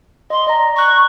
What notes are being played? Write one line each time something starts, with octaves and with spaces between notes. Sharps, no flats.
D#5 C6
D5 D#5 A#5
A#5 C#6 F#6